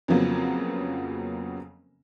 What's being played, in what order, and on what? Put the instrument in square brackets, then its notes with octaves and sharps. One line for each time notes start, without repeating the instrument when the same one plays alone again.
[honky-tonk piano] F2 C#3 F3 F#3 A#3 B3